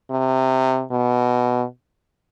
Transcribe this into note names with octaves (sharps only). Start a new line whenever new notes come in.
C3
B2